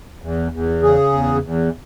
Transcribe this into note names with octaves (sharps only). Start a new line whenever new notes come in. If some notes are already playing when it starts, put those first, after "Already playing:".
E2
E2
C#3 G#4
E2
E2